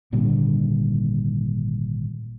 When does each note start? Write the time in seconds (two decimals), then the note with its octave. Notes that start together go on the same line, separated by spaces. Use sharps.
0.12 G#1 A#2 D3 G3